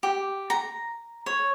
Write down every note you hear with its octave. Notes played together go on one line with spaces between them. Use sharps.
G4
A#5
C#5